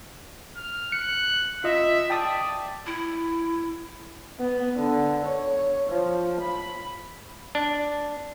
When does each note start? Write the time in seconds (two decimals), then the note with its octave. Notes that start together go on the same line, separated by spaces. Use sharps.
0.56 F6
0.92 F#6 C#7
1.64 F4 D#5 E5
2.10 D5 G5 A5 D#6
2.86 E4
4.39 B3
4.77 D3
5.25 C#5
5.90 F3
6.41 B5
7.55 D4